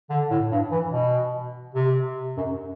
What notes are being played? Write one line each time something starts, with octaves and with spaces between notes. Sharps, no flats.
D3
A2
G2
E3
B2
C3
F#2